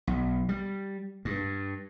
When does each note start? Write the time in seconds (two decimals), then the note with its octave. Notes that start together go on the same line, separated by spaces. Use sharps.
0.07 B1
0.49 G3
1.25 G2